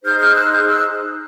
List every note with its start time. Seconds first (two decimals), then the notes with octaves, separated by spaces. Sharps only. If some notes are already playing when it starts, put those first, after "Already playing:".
0.03 D#4 G#4 C5 F6 G6
0.19 F6 G6
0.35 E6 F#6
0.52 F6 G6
0.63 F6
0.67 E6 F#6